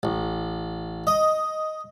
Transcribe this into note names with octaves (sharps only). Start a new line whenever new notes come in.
A1
D#5